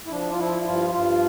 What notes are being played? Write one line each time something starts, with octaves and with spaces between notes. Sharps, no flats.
E4
F3 D4
F4
F3 E4
G2 F4
G2 F4